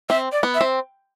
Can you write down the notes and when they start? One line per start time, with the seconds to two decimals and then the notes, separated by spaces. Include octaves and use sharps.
0.09 C4 E5
0.32 D5
0.43 B3
0.55 E5
0.61 C4